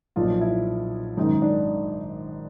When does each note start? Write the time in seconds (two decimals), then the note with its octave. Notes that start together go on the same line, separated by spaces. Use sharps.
0.16 B1 A#2 F3 F4
0.41 E4
1.17 G#1 F#2 D#3 D#4
1.42 D4